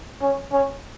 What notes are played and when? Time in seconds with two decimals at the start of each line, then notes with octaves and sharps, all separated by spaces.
0.23 C#4
0.53 C#4